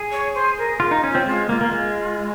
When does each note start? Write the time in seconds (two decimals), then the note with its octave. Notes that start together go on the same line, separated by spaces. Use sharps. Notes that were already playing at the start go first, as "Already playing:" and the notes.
Already playing: G#4
0.11 C#5
0.34 C5
0.58 A#4
0.80 F4 G#4
0.91 D#4
1.04 C#4
1.11 C4 F4
1.26 G#3 F4
1.49 A#3 F4
1.61 A#3
1.71 G#3